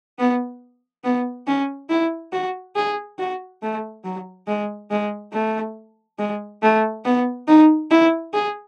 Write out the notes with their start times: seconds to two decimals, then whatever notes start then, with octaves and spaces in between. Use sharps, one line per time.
0.19 B3
1.04 B3
1.47 C#4
1.90 E4
2.33 F#4
2.76 G#4
3.19 F#4
3.62 A3
4.04 F#3
4.47 G#3
4.91 G#3
5.33 A3
6.19 G#3
6.63 A3
7.05 B3
7.48 D#4
7.91 E4
8.34 G#4